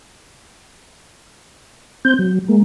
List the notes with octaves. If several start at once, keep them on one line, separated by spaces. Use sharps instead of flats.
C4 G6
F#3
G#3 A#3